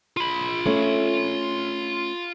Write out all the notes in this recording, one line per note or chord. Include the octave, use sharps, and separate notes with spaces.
F4 B5
A3 C#4